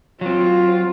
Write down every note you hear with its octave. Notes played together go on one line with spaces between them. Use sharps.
F#3 C4 F4